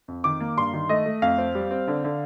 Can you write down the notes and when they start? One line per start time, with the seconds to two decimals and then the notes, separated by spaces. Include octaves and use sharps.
0.08 F2
0.24 D#3 D6
0.40 A#3
0.57 G2 C6
0.73 D#3
0.89 A3 D#5
1.06 A3
1.22 F2 F5
1.38 C4
1.55 G3
1.71 C4
1.88 D3
2.04 D3